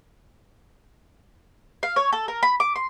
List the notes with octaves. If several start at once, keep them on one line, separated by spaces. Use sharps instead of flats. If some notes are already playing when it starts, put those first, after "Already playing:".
F5
C#5
A4
A#4
B5
D6
C6